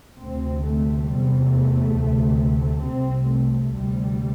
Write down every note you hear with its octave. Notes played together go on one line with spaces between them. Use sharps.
D2 C3 C4
A3
E2 C3 G3
A3
D2 C3
A3
C2 C3 C4
A3
D2 C3 G3